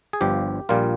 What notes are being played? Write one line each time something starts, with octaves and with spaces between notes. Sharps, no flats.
G#4
G1 G2 F3 G4
A#1 A#2 G3 A#3 F4